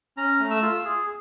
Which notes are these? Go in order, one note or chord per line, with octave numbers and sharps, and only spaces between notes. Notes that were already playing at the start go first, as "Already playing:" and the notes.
C#4 A#5
A3
E6
F4
G#4